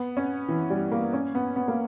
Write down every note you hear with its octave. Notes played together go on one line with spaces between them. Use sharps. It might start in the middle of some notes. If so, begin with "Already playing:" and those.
Already playing: B3
C#4
E3
G3
A#3
C#4
B3
B3
A#3